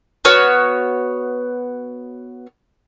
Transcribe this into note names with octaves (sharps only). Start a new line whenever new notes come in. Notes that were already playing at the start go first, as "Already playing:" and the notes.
B3 F#4 C#5 F6